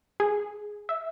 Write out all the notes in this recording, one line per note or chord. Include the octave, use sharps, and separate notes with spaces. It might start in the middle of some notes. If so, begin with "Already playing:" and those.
G#4
E5